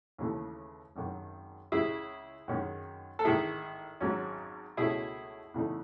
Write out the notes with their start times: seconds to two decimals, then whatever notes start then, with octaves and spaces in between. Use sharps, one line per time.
0.18 D#2 C#3 E3 A3
0.96 G#1 F#2 D#3
1.72 C#2 C#3 G#3 E4 G#4
2.48 F#2 D#3 G#3 C#4
3.19 A4
3.25 A1 G#2 D#3 E4 G#4
4.00 G#1 G#2 F#3 C#4
4.77 C#2 B2 A3 C#4 E4 G#4
5.54 E2 C#3 E3 A3 D#4